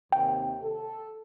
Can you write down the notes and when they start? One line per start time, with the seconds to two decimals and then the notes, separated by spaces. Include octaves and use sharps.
0.12 D#2 C3 G5
0.62 A4